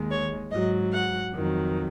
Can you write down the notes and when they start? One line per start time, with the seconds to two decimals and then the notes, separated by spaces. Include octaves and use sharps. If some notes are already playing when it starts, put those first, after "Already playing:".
Already playing: D#2 D#3 G#3
0.11 C#5
0.51 G#2 F#3 D#5
0.92 F#5
1.33 F2 D#3 F#3